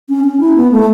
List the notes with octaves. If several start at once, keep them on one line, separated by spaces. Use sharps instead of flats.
C#4
C#4
E4
B3
A3